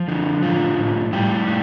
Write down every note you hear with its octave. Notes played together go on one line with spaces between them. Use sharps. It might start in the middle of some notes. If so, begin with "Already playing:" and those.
Already playing: F3 F4
D3
A2 F3 F4
A2
A2 G3 G4
A2